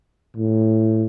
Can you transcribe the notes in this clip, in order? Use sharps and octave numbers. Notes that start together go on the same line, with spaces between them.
A2